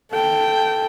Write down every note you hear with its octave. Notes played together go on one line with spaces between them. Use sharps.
A4 G5